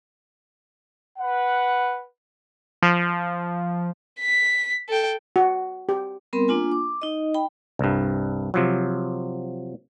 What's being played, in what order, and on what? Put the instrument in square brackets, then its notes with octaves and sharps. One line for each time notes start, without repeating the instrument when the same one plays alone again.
[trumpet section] B4 F#5
[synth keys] F3
[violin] B6
A4 G5
[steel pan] F#4
G4
[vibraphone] G3 B3 C4 A#4 B5 C6
A#3 D4 F4 G#5
D6
D#4 D#5
G5 B5
[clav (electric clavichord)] C2 G2
C3 F3 F#3